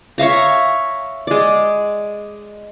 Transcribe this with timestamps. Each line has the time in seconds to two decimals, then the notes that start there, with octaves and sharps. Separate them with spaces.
0.18 C#5 E5 F5 A#5
1.27 G#3 D5